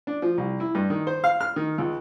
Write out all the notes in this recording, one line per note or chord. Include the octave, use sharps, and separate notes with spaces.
D4
F3
C2
E4
G2
D#3
C5
F5
F6
D#3
C#2